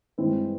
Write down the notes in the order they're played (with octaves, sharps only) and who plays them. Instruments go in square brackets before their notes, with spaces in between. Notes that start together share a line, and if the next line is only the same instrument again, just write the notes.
[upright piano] G2 E3 G#3 C4 E4